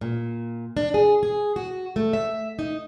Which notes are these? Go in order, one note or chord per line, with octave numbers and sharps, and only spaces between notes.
A#2
D4
G#4
G#4
F#4
A3
E5
D#4